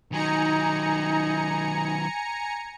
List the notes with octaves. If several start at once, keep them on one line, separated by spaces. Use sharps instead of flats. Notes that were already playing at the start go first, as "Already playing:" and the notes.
D#3 F#3 D#4 G#5 A#5 C#7